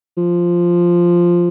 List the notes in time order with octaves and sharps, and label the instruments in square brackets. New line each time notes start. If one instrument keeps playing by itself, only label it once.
[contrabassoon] F3